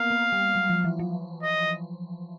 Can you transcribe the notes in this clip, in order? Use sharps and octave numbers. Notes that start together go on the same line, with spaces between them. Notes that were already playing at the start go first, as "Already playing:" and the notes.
Already playing: A#3 B3 F5
A#3
G3
F#3
F3
E3
F3
D#5